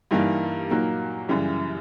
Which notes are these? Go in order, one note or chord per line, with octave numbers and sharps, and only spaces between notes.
G2 E3 G3 A#3 D#4
A#2 F#3 A#3 D#4
F#2 C#3 E3 G3